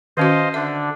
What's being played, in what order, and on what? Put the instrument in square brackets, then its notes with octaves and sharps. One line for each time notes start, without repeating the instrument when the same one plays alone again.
[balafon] D#3 C#4 F#4 [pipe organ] C5 D#5 F5
[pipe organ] D3 D4 [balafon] E5